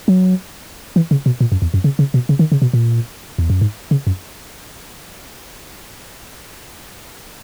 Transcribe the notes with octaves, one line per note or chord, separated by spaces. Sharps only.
F#3
E3
C#3
B2
A#2
F#2
E2
F#2
C#3
C#3
B2
C#3
D#3
C#3
B2
A#2
E2
F#2
G#2
C#3
F#2